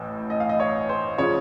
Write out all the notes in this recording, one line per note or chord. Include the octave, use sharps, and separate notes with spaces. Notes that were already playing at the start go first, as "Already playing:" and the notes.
Already playing: A1 A2
D#5
F5
D#5
C#5
C5
C#3 F3 C#5